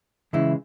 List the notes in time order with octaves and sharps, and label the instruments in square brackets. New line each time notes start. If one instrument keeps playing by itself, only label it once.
[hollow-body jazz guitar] C#3 E3 G#3 E4